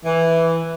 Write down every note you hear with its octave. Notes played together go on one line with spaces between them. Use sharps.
E3